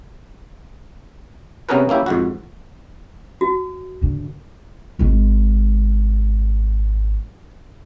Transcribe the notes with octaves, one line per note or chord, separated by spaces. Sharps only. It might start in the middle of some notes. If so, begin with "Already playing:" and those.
C3 B3 C#4 G#4 A#4 B4
A#3 C#4 E4 G4
F2 G#2 F#4
F#4
G#2 D3
G#1 G#3